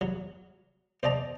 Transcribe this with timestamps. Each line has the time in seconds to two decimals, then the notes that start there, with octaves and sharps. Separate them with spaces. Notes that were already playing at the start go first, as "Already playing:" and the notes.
0.01 F#3
1.03 C5 D5 D#5 A5 A#5